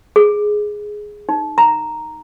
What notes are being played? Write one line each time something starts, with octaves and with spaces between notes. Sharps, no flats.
G#4
D#4
A#5